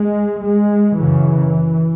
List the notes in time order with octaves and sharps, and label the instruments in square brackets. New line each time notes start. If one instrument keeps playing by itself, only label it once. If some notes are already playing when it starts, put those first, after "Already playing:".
Already playing: [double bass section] G#3
G#3
F#2 C#3 E3